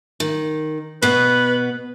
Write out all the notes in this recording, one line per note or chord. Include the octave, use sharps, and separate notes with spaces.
D#3
B2 B3 B4